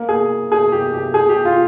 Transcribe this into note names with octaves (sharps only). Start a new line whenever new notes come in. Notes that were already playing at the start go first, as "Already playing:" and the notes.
Already playing: A#3
G#4
G#4
G4
G4
G#4
G4
F4